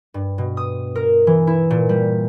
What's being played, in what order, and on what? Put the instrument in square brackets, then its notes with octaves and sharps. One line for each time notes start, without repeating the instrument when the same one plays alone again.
[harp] G2
B2
D#6
A#4
E3
E4
A#2
G3